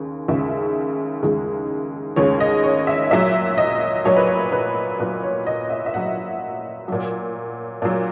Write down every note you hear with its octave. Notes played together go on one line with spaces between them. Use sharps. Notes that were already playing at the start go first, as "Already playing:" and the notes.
Already playing: D#2 C#3
D#2 C#3 G#3 E5
D#2 C#3 G#3
D#2 C#3 G#3 C#5
D#5
C#5
E5
A#2 F#3 E5
D#5
A#2 F#3 C#5
B4
C#5
B4
A#2 F#3 B4
C#5
D#5
E5
E5
A#2 F#3 F#5
A#2 F#3
A#2 F#3